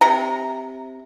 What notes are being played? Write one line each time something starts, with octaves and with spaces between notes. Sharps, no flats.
C3 A#5